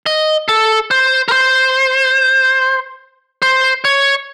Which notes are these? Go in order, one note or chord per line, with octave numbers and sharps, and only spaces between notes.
D#5
A4
C5
A#4
C5
C5
C#5